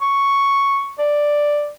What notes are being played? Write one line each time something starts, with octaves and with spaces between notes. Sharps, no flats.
C#6
D5